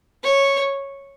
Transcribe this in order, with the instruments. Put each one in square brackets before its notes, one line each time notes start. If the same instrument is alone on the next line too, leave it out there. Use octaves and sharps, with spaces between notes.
[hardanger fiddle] C#5